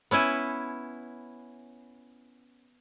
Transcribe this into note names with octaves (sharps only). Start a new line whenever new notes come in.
B3 C#4 E4 G#5